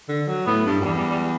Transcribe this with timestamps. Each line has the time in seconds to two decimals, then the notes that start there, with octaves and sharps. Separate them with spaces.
0.09 D3
0.27 F#3
0.47 A2 B3
0.66 G2
0.81 F#2
0.85 E2 G3
0.97 G3
1.11 G3